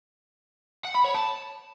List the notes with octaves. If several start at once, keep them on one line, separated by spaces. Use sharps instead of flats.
F#5
B5
C#5
A5